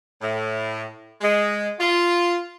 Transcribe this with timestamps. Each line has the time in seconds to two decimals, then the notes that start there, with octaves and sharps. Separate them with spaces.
0.21 A2
1.21 G#3
1.79 F4